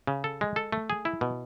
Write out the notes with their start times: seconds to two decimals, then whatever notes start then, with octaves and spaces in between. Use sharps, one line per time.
0.07 C#3
0.24 A4
0.41 G#3
0.56 A4
0.72 A3
0.90 G#4
1.05 E4
1.21 B2